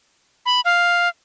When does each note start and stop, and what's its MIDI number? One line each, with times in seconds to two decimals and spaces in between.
0.46 0.61 83
0.65 1.09 77